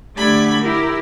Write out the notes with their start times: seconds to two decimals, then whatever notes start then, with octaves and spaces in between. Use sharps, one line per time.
0.16 D3 A3 D4 G4 B5 G#6
0.60 E4 G4 A#4